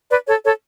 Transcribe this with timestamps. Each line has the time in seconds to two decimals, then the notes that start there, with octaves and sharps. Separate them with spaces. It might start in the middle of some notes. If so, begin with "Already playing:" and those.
0.10 B4 D5
0.27 A4 C#5
0.44 A4 C#5